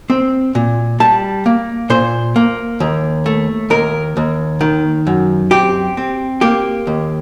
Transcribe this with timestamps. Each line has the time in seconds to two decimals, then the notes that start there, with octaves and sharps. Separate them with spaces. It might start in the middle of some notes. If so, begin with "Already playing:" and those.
0.10 C4
0.55 A#2
1.00 G3 A5
1.46 A#3
1.90 A#2 C5
2.36 A#3
2.80 D#2
3.26 A3
3.70 D#2 A#4
4.17 D#2
4.61 D#3
5.07 F#2
5.51 C4 G4
5.97 C4
6.41 A#3 G4
6.87 D#2